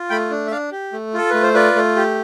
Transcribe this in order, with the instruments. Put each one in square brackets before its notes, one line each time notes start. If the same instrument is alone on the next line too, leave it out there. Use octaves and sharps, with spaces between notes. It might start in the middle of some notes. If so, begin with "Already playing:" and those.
Already playing: [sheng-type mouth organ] F4
A3 G5 B5
D4
E5
D4 D5 F5
G4
A3
F4 A4
A3 B4
C5
F4 B4 D5
A3
G4